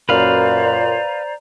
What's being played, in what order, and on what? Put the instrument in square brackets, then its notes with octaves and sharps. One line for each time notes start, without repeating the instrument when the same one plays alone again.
[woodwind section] F#2 A#2 [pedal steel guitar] B4 F5 [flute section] C5 D5 A#5